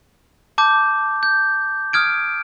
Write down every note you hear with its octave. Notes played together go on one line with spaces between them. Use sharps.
A5 D6 G6
G6
D#6 F6 G#6 D7